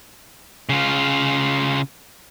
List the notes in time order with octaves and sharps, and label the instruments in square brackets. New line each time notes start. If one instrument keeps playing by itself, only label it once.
[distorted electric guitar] C#3 F4